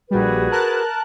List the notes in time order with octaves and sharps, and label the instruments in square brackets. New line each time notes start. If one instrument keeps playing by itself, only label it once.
[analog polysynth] A#1 G3 [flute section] F#4 G#4 B4
[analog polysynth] A#4 A5 F#6